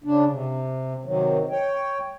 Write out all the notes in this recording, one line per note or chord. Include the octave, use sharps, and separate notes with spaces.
C#3 D4
C3
C3 D#3 F#3
C#5 G5